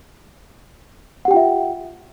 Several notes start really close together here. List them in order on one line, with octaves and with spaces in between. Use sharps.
F#5 G4 G5 F4 E5